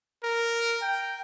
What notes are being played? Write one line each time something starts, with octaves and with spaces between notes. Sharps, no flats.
A#4
G5